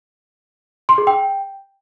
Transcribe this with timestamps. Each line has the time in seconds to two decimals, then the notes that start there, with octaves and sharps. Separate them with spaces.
0.89 C6
0.98 G#4
1.07 G5